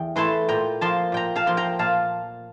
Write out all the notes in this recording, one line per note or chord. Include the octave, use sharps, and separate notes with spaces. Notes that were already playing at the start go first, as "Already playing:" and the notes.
Already playing: E2 G5
E3 A3 E4 A5 C6
A#2 G5 A#5
F3 A#3 A5 C6
A#2 G5 A#5
F5 A5
F3 A#3 C6
G5 A#5
A#2 F5 A5